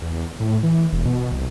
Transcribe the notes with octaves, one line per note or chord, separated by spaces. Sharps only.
E2
A2
E3
E1
B2
C2